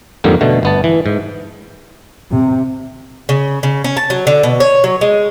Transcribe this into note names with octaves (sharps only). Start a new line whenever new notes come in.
F2 G#2 D3 G3 A#3
B2 D3 A3
G1 B3 A5
E3
G#2
C3
C#3
C#3
C#4
A5
F#3
D3
B2
C#5
F#3
G#3